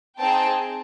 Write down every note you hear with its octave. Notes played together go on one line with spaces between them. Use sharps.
C4 D#4 G#4 G5 A5